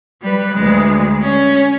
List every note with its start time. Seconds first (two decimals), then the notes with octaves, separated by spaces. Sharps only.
0.22 G3 B4
0.54 D2 G#3
1.22 C#4